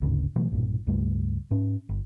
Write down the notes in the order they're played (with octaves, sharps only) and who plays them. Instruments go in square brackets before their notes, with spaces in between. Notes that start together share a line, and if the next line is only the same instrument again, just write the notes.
[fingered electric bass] G1 D2 G#2 C#3
B2 E3 F#3 A3
B1 G2 A#2
C#2 G2 G3 A3
G#2 C#4
G1